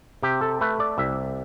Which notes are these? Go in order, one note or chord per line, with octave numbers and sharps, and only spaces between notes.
C3 G4
A4
A3 B4
D5
C2 E5